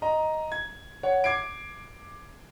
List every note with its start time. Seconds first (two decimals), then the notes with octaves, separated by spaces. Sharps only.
0.02 D#5 A#5
0.52 G#6
1.03 C#5 F#5
1.24 D6 G#6 C7 D7